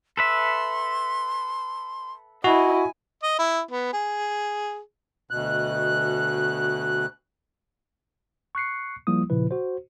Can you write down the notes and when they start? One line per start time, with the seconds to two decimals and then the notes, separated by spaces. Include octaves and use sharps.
0.17 A4 B4 E5 C6
2.44 E4 F#4 D#5 G#5
3.23 D#5
3.39 E4
3.71 B3
3.93 G#4
5.31 D2 B2 F#6
8.55 C#6 F#6 C7 C#7
9.07 F3 G3 A#3 E4 D#6
9.30 A#2 C#3 F3 E4 B4
9.51 F#4 C5